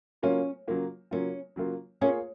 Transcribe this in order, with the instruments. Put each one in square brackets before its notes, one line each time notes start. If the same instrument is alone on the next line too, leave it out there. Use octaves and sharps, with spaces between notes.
[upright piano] C#3 F#3 A#3 F4 [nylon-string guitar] C#4
[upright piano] C#3 F#3 A#3 F4
[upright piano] C#3 F#3 A#3 F4 [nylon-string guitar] C#4
[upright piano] C#3 F#3 A#3 F4
[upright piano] A#3 F4 G#4 C#5 [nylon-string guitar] C#4